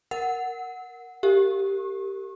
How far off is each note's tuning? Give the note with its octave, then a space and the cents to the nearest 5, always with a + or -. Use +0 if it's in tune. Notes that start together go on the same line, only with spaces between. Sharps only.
A#4 +0 F#5 +0
G4 -5 A#4 -30